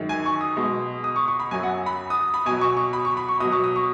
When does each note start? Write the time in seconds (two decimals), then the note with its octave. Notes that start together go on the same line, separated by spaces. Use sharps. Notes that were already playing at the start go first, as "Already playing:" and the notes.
Already playing: F#2 D#3 G#3
0.09 G#5
0.26 C#6
0.41 D#6
0.56 B2 G#3
1.04 D#6
1.16 C#6
1.28 C#6
1.40 B5
1.51 F#2 F#3 G#5
1.63 F#5
1.86 B5
2.10 D#6
2.34 B5
2.46 B2 G#5
2.50 F#3
2.61 C#6
2.77 C#6
2.93 B5
3.05 C#6
3.17 B5
3.29 C#6
3.40 B2 D#6
3.44 F#3
3.52 C#6
3.64 D#6
3.76 C#6